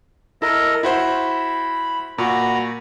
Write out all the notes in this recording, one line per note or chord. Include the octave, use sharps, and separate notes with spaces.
E4 A4 A#4 D#5
E4 F#4 C5 B5
A#2 F#4 A#5 B5